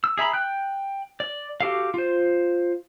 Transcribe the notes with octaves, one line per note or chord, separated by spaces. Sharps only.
E6
G#4 E5 A#5 B5
G5 F#6
D5
F#4 G4 A4 F5
F4 C5